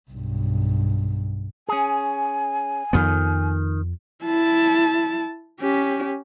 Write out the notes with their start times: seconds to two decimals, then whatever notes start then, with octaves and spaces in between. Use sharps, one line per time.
0.11 B1 G2
1.69 C#4 G#4 G#5
2.93 F2 D#3 B3
4.24 E4 A5
5.61 C#4 G4